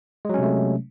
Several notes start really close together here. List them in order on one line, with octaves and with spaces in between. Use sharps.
G#3 F#3 C#4 C3 A3